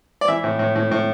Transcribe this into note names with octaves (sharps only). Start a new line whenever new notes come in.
D5
E3 E5
A2
A2
A2
A2